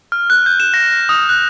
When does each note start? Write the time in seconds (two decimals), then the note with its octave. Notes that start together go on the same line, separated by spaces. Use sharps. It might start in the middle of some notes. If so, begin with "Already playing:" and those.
0.12 F6
0.30 F#6
0.46 G6
0.60 E7
0.74 A#6
1.09 D#6
1.29 F#6